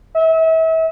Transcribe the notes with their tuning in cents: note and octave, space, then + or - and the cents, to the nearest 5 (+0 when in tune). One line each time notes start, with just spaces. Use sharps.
E5 -35